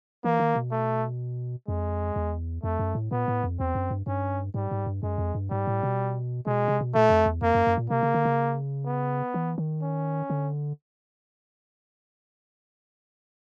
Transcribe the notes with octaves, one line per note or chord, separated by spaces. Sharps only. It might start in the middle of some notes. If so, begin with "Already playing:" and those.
E3 A#3
D#3
B2
A3
F2 G#3
E2
F2 A3
F#2
A2
A#2 B3
A2
F2
E2 C4
F#2
G2
G2 C#4
G#2 G3
G#2
G2
F#2 G#3
F2
G2
G#2 G3
A2
B2
B2 G#3
C3
B2
A#2 A3
F2
E2
F2 A#3
F#2
F#2
A#2
C3 A#3
C#3
D3
C#3
B3
E3
D#3
C#4
D3